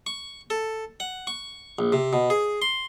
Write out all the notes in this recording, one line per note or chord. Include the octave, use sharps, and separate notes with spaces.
C#6
A4
F#5
C#6
A#1
C3
B2
G#4
C6